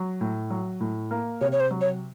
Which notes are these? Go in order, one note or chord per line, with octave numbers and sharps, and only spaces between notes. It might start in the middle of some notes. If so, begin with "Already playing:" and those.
Already playing: F#3
A2
F#3
A2
A#3
C3 C#5
C#5
C5
F#3
C#5